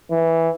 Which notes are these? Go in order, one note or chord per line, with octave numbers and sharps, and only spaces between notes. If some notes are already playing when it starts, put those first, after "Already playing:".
E3